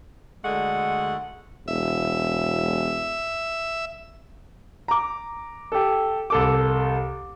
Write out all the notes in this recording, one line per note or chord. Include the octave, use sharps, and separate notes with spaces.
D2 D3 G#3 A3 F#5
E1 E5
A#5 D6
G4 A4
C2 A4 D6